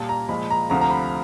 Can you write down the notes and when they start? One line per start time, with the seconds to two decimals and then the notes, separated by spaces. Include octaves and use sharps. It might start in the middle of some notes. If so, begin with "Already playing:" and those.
Already playing: A#2 G3 A#3 A5
0.09 A#5
0.29 A#2 F3 G#3 B5
0.50 A#5
0.70 D2 C3 F3 A3 A#5
0.81 A#5
0.90 B5